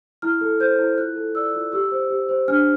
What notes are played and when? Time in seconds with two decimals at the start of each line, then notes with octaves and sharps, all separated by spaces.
0.22 E4 F6
0.41 A4
0.60 C5 G6
0.79 E4
0.97 F4 F#6
1.16 A4
1.35 D5 E6
1.54 F4
1.72 G4 E6
1.91 C5
2.10 G4
2.29 C5
2.48 D4 F6